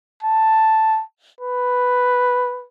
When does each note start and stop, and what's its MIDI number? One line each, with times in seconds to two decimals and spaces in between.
0.23 1.02 81
1.40 2.65 71